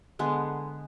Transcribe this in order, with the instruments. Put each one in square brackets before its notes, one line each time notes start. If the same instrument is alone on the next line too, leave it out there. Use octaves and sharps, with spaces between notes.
[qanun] D3 G#3 B3